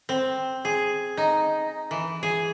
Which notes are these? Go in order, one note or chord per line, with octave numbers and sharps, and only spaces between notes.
C4
G#4
D#4
E3
G#4